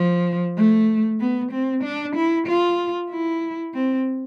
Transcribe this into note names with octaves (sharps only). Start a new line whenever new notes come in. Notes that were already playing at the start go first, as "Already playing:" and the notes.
Already playing: F3
A3
B3
C4
D4
E4
F4
E4
C4